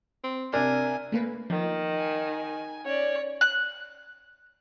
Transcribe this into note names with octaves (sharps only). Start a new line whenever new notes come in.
C4
C3 D4 A#4 G#5
A3 A#3 B4
D#3 F3
G#5
C#4 C#5 D5
F#6